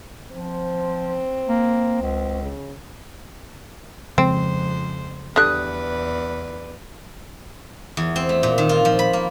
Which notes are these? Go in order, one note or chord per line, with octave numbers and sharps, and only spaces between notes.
F3 C4
A#3
C#2
C#3
F2 C#3 F3 G#3 C4 C5
E2 D3 G3 B4 D5 D#6 F#6
E2
C4
A3
A#2
D#3
F4
F3
B5
A#3